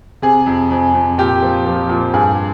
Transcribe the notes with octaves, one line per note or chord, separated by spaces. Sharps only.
C3 G#4
F2
F2
F2
A#2 G4
F3
F3
A#2
G2 G#4